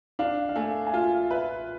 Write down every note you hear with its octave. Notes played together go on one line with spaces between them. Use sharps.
D4 F5
F5
A3 G#5
G#5
F4 F5
B4 E5